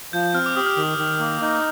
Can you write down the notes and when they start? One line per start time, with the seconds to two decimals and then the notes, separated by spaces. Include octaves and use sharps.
0.13 F3 G6
0.34 C4 F6
0.46 D6
0.56 G4 D#6
0.66 F6
0.77 D#3
0.98 D#3
1.20 A#3
1.41 D#4